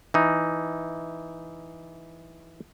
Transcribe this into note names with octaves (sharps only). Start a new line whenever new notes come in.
E3 D#4